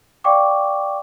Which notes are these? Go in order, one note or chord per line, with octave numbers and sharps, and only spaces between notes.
D5 F5 G5 C#6 D6